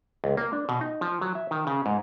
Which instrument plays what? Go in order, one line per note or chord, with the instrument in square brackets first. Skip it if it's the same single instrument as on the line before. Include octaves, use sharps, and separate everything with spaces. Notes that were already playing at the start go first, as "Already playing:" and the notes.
[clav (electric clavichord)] C#2
A#3
D4
B2
D#4
F3
F#3
E5
D#3
C#3
G#2